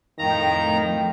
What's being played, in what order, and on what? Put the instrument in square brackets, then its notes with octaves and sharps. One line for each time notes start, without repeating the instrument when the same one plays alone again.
[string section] F2 A2 [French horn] D#3 [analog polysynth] F5 G5 [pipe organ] A#5